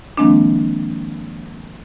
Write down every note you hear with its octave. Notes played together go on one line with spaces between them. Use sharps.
D#3 F3 G#3 A#3 C4 D4